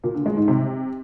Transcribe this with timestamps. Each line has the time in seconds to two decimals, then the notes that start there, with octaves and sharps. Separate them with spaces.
0.04 A#2
0.15 D3
0.26 G#3
0.37 G#2
0.48 C3